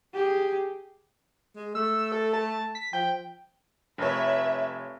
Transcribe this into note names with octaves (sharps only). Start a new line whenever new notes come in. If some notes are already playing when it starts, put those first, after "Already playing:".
G4 G#4
G#3
A3 E6
A4
A5
B6
F3 G5
F1 B4 C#5 E5